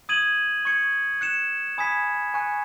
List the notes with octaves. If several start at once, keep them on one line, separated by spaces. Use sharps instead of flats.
D#6 G#6 D#7 F#7
C#6 G#6 C#7
F#6 C#7 E7
G#5 B5 D#6 G#6 B6
G#5 C#6 F#6 C#7